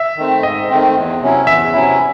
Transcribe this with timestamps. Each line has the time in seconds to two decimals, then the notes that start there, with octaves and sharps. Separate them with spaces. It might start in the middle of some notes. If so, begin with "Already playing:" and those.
Already playing: E5
0.17 D#3 A3 C4
0.43 G#2 D#5
0.70 D#3 A3 C4
0.95 E2
1.21 C3 F#3 C#4 E4
1.47 E2 E5
1.74 C3 F#3 C#4 E4